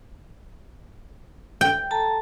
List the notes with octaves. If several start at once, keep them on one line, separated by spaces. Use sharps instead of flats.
G5
A4 A5 A#5